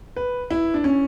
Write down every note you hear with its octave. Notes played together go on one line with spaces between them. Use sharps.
B4
E4
D4
C#4